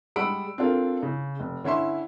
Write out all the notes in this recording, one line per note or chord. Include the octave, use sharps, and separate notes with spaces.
G3 G#3 F#5 B5 E6 D7
C4 D4 F4 A4 A#4
C#3
F1
D3 C#4 E4 E5 C6